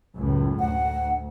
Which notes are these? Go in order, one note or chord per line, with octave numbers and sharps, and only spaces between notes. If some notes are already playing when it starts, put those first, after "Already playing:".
C#2 F#2 A2
D2 F#5